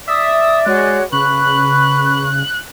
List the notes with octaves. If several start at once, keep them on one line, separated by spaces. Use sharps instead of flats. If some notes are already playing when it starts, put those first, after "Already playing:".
D5 E5 D#6
G#3 F#4 C#5 F#6
C#3 B4 C#6 F#6